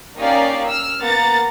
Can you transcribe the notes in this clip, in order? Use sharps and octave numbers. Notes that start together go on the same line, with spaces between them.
A#3 C#4 D#4 G4 D5 F5
E6 F6
A#3 B3 F#5 A#5 A6